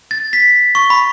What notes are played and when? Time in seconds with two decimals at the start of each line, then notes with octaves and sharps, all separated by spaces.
0.11 A6
0.33 B6
0.75 C#6
0.90 B5